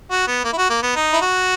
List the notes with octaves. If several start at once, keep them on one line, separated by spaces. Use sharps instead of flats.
F#4
B3
A#3
E4
F#4
A#3
B3
D#4
E4
F#4